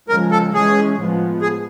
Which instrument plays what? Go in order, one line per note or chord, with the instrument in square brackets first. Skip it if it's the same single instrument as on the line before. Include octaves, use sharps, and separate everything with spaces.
[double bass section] C#3 F3 G#3 [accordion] A#4
[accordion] A4
[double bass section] E3 G#3 C#4 [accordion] G#4
[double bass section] A2 F3 G#3 B3
[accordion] G#4